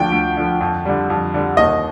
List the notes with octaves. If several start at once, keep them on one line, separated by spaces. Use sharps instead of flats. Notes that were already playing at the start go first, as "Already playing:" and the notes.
Already playing: D2 D3 F3 G5
D2
D3 F3
F2
D3 G3
F2
D3 G3
D#2 D#5